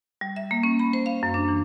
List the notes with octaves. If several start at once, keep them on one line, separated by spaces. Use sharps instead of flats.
G3
E5
A#3
C#4
B5
C5
F5
F#2
D4
E3